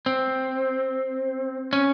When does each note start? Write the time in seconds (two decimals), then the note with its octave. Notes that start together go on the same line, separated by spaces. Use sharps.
0.06 C4
1.73 C#4